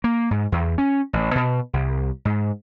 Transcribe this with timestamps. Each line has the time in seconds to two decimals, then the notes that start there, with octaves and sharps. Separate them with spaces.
0.04 A#3
0.31 G#2
0.52 E2
0.78 C#4
1.13 A1
1.35 B2
1.73 C2
2.25 G#2